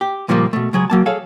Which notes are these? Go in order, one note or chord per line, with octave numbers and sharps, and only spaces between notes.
G4
C#2 A#2 F3 G3 A3 A#3
B2 A3
C#2 F#3 G#4
F#3 A#3 A5
G#4 A4 C#5 F5